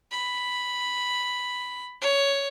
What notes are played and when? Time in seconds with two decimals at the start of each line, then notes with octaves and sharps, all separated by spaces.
0.12 B5
2.01 C#5